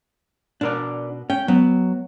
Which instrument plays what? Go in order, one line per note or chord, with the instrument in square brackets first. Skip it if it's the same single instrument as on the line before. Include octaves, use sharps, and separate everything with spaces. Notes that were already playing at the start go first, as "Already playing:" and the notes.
[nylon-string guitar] B2 [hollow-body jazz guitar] D4 A#4 D5
[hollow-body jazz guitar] C#4 [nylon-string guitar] G5
[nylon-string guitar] F#3 [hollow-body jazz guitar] B3